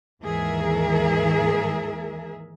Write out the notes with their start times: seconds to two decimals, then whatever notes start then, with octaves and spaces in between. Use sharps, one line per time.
0.23 D#2 G#2 E3 G#4 A#4 E5